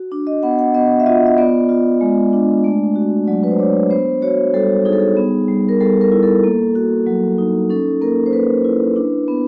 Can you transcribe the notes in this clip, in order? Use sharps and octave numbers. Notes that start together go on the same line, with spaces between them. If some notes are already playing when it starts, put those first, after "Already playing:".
Already playing: F#4
D4
D#5
B3 F#5
F#5
B3 D#5
E5
F4 D#5
D#5
B3 D5
F4
G#3
D4
A3
F#4
F#3 D5
B4
C5
D4 C#5
B3 C5
F#4 C#5
G3 A4
D#4 G#4
A4
G#4
B3
G3
A#4
G3 A4
A#4
E4
A4
A#3
F#4
F#3
D#4
C#4 A4
A#3 A#4
C5
A#3 B4
E4
D4
B3